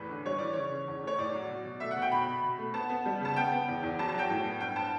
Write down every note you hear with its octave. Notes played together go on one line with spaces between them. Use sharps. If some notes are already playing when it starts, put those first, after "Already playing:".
Already playing: E2 A2 B4
D3
G3 C#5
E3 D5
C#3 C#5
C#3
E2
A3 C#5
A2 D5
F#3
B2
B2
A3 E5
F#5
B2
G5
B2 B5
B2
B2
A3
B3 A5
B3
G3
C#3 A5
B3 G5
B3
E2
E2
F#3 A5
A5
F#3 G5
A2
B3
G2 G5
B3 A5